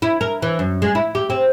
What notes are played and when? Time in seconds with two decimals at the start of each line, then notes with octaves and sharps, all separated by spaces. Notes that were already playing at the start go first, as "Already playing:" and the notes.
0.02 E4
0.21 A#4
0.42 E3
0.59 F#2
0.82 G#3
0.95 E4
1.15 G4
1.30 C4